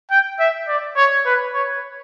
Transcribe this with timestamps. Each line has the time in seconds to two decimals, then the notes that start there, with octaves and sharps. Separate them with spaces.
0.11 G5
0.40 E5
0.68 D5
0.96 C#5
1.26 B4
1.54 C#5